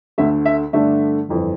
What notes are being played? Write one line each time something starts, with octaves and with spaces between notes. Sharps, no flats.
D2 D3 A3 E5
E5
G2 D3 A3 D4 E5
G1 F2 E3